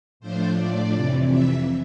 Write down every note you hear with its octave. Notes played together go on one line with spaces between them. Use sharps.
A2 F3 A3 D4 C5
D5
F2 C3 E3
E5